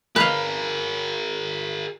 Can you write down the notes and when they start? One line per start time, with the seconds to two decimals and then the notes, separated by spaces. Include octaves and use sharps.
0.16 G#4 A#4 B4 F5